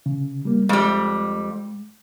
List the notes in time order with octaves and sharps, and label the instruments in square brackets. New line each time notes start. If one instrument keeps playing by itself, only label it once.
[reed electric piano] C#3
G3 A#3
[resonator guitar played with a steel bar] F2 G3 [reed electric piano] G#3